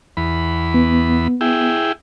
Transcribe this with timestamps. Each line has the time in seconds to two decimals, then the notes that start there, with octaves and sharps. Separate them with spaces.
0.17 E2 B5
0.74 B3
1.41 E4 G#4 G5